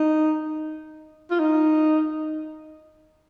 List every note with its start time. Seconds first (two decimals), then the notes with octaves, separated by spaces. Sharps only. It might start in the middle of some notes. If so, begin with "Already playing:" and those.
Already playing: D#4
1.31 F4
1.39 D#4